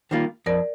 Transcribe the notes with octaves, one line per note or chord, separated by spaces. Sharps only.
D#3 G3 A#3 F4
F2 A#4 D5